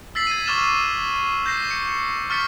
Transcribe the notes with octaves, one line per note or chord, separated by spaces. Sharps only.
E6 A6 B6 C7 F#7
G#6 D#7
C#6 D6 F6 A6 E7
G6 A#6 C7
C#7
C#6 F6 A6 B6 C#7